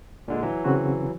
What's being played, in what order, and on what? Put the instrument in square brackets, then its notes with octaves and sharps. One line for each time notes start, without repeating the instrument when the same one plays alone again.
[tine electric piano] A#2 D3 G#3
E3 F#3
[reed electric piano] C#3 C4 F#4